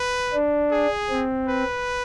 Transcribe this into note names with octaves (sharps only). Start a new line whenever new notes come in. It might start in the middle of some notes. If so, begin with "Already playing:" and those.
Already playing: B4
D4
G#4
C4
B4